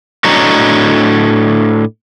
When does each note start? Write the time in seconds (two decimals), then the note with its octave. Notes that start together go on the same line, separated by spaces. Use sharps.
0.25 A2 D4 F#4 C#5 D#5 A#5